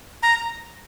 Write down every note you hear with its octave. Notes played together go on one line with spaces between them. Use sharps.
A#5